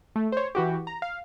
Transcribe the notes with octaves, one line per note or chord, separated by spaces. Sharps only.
A3
C5 C#5
E3 F#4 G4
A#5
F5